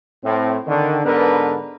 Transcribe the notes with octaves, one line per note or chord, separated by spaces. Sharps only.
A2 C4
D3 D#3
G#2 D3 B3 D4 A#4 B4